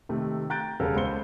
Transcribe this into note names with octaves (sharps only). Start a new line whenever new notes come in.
C3 D#3 A3
G5 A#5 F#6 G6 A6 D7
E1 C#3 G3 A4 A#4 F#5
C#2 B3 C5 C#7 G7